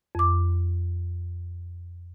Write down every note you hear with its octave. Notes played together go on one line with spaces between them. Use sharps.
F2 D6